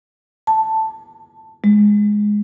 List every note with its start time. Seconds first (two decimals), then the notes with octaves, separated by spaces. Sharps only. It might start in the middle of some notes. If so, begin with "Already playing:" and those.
0.47 A5
1.64 G#3